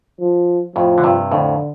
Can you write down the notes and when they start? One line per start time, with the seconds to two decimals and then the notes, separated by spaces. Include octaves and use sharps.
0.21 F3
0.76 F2 A2 F3
0.98 D3
1.03 G2 C3
1.32 F2 A2 D3